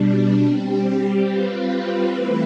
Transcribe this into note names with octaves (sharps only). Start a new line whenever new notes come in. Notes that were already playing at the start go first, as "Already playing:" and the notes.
Already playing: B2 G3 D4
G3 C4 G4
G3 C4 F4 B4
E3 A3 C4 E4 B4